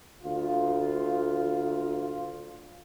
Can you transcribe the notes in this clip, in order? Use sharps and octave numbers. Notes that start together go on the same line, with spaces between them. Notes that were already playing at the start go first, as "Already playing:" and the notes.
D2 F4